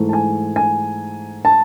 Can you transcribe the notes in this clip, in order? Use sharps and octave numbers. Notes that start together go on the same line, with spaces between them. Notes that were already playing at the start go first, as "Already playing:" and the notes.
Already playing: G#2 E3 A3
A5
G#5
G#5
A5